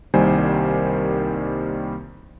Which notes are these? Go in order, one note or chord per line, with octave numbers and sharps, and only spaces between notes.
C2 D#3 G3 A#3 C5 G#5